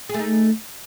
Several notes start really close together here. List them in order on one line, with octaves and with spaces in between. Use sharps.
G#4 A3 D#4